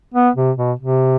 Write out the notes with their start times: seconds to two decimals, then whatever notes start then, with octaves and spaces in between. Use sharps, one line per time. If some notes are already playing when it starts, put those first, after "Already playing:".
0.14 B3
0.36 C3
0.57 B2
0.79 C3